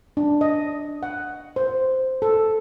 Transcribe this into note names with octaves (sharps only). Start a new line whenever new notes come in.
D4
D#5
F#5
C5
A4